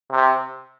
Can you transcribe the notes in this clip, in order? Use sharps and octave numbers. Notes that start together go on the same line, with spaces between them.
C3